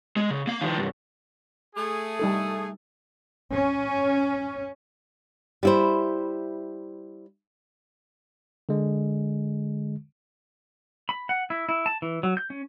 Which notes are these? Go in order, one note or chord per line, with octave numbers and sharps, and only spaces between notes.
G#3
C#3
A#3 F5
D#3 F3
C2 G2
A3 G#4
G3 D#4 A4
C#4
G3 E4 C5
D3 G#3
B5
F#5
E4
E4
A5
E3
F#3
G6
C#4